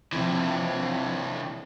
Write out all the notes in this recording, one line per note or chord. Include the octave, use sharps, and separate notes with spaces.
C3 E3 F3 C4